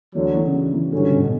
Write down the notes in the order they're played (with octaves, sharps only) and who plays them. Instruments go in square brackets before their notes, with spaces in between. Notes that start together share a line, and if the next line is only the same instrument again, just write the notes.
[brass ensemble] D2 D3 F#3 [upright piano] E3
[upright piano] E3
C#3
F#3
E3
[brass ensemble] G2 F#3 C#4 [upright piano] D3
[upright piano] B2
B2